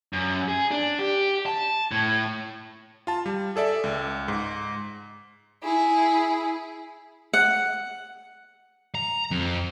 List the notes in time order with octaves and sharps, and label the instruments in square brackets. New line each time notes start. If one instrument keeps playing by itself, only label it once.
[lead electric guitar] F#2
G#4
D4
G4
A5
A2
[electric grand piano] F4 A5
G3
G#4 A4 D5 E5
C#2
G#2
[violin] E4 G#4
[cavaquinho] F#5
[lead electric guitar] A#5
F2